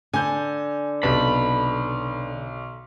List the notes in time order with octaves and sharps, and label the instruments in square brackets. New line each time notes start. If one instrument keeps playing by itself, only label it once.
[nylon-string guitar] D3 [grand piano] G#5 G6
[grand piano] B1 [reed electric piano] C3 B4 A5 [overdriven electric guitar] B5